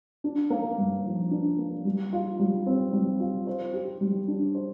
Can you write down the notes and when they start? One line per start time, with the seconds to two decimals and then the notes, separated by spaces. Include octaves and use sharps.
0.24 D4
0.50 A#3
0.78 G2
1.05 F3
1.31 D4
1.58 A#3
1.85 G3
2.13 F4
2.39 G3
2.66 C4
2.93 G3
3.20 F4
3.47 C5
3.74 G4
4.01 G3
4.28 D4
4.55 C5